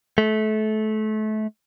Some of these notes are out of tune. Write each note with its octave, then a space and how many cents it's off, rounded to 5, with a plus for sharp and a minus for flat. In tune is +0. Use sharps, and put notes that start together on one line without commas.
A3 -30